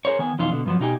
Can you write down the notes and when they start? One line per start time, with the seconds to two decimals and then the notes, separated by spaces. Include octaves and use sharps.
0.05 G#4 A#4 C5 C#5
0.19 D#3 B3 G#5
0.39 F2 B2 E3 D#4 F4
0.51 B2 D3
0.66 G2 F3 F#3
0.80 B2 D#4 G4 G#5